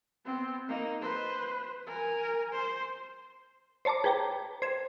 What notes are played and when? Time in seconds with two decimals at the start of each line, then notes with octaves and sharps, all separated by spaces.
0.25 B3 C4
0.69 A#3 D#4
1.01 B4 C5
1.87 A#4 G#5
2.53 C5
3.85 C5 C#5 A5 A#5 D6
4.04 G#4 B4 G5 A5 A#5
4.62 C5 G#6 E7